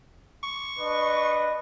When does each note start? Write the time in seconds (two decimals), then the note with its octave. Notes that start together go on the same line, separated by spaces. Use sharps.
0.43 C#6
0.79 D4 B4 D#5